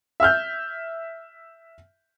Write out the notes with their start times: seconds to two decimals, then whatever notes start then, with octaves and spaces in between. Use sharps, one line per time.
0.20 E5 E6 F6 G6